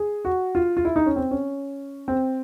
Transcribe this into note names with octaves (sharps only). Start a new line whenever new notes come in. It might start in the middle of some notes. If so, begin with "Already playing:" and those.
Already playing: G#4
F#4
F4
F4
E4
D#4
C#4
C4
C#4
C4